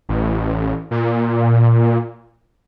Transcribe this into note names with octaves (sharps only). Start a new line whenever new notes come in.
A1
A#2